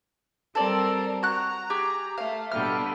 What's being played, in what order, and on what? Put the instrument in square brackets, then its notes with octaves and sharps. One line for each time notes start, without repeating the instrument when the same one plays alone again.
[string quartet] G3 C4 A#4 [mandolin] A4 D5
[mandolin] F#4 F#6 [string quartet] A#5
[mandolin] G4 G#4
[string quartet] A3 [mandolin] F5
[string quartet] B2 D3 G3 [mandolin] F6